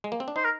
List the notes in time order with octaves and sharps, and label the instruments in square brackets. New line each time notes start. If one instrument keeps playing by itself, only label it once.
[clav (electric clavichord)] G#3
A#3
C4
D4
[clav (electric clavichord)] D#4 [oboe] C5
[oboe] A#4